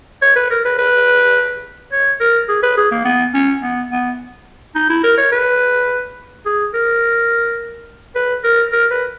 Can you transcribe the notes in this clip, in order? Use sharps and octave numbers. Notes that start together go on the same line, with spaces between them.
C#5
B4
A#4
B4
B4
C#5
A#4
G#4
B4
G#4
A#3
B3
C#4
B3
B3
D#4
E4
A#4
C#5
B4
G#4
A#4
B4
A#4
A#4
B4